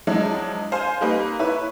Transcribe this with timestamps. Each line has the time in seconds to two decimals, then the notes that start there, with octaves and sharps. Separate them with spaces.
0.07 F3 F#3 G#3 D4 E4
0.72 C5 F5 G#5
1.01 G3 A#3 D#4 B4
1.39 E4 B4 C#5